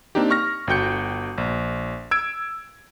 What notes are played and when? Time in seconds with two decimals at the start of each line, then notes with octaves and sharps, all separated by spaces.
0.15 A#3 C4 D4 D#4 G4
0.30 C#6 F6 A#6
0.67 G1 F#4 G5 G6 C#7
1.38 A#1
2.11 E6 G#6 D7